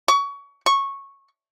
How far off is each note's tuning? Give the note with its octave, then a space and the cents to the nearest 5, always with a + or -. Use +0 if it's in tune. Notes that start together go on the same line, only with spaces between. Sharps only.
C#6 +25
C#6 -10